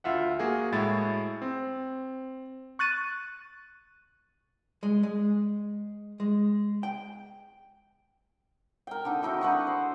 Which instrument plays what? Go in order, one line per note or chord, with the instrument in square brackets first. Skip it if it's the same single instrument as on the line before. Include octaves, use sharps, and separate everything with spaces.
[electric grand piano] D2 F4 E5 F#5
A#3 F#4 G#4
A2 G#3 E4 F#4 A6
C4
[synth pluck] C#6 F#6 A6 D#7
[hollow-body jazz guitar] G#3
G#3
G#3
G5
[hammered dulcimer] A#4 G5
D3 D#4
D#3 D#4 E4 F#4
D3 B4 C#6
C5